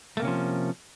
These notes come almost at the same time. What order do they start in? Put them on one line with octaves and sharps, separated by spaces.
A3 A#3 C3 C#4 F3